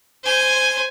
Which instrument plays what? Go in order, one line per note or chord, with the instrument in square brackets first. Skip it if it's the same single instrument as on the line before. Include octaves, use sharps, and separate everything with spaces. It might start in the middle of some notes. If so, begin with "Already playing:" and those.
[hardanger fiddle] C5 G#5